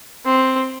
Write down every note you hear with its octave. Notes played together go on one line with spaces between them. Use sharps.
C4